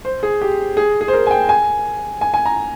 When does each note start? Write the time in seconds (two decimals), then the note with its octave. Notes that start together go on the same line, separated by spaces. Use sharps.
0.05 C5
0.23 G#4
0.42 G4
0.77 G#4
1.01 G#4
1.08 C5
1.13 A#4
1.27 G#5
1.31 G5
1.49 G#5
2.21 G#5
2.34 G#5
2.45 A#5